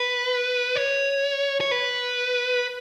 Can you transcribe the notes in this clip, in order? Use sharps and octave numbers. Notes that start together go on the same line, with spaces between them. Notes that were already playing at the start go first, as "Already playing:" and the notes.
Already playing: B4
C#5
C#5
B4